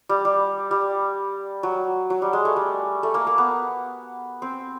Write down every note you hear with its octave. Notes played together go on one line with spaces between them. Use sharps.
G3
G3
G3
F#3
F#3
G3
G#3
A3
G3
A3
A#3
A#3
B3
C4